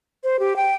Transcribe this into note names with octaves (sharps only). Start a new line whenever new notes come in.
C5
G4
G5